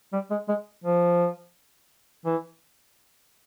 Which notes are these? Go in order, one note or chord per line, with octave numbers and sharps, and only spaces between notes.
G3
G#3
G#3
F3
E3